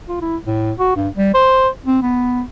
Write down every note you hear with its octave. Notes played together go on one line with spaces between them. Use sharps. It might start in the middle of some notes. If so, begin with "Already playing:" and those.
F4
E4
A2
F#4
G2
G3
C5
C4
B3